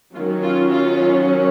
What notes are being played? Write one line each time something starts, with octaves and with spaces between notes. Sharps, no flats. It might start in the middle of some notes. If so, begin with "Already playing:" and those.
D#3 F#3 C#4 F4
F4
F4